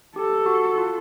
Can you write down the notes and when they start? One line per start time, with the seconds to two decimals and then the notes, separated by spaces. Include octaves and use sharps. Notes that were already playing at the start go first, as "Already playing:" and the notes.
0.16 G4 A4
0.46 F#4
0.78 F4